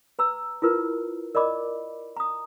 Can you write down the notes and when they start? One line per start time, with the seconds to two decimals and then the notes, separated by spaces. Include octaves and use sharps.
0.19 B4 A#5 E6
0.62 E4 F4 A#4 B4
1.35 A#4 D5 D#5 B5 D6
2.17 A#5 D#6